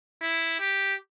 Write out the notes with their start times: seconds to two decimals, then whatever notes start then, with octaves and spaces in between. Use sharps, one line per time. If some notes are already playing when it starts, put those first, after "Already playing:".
0.22 E4
0.60 G4